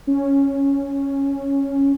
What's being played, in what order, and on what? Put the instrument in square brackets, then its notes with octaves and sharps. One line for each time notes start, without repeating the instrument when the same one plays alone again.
[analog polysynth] C#4